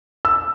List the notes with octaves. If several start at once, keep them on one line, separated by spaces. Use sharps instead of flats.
E6